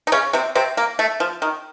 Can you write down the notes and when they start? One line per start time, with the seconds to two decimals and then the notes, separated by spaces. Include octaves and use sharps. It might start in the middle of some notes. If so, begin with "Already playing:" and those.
0.07 D#4
0.12 C#3 C#4
0.33 C3 C4
0.55 C3 C4
0.77 A#3
0.99 A3
1.20 F3
1.42 D#3